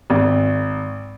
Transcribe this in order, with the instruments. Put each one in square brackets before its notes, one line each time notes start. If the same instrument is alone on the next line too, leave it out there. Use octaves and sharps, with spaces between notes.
[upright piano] G#1